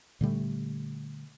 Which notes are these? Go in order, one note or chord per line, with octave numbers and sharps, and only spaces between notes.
A#2 D3 G3 A3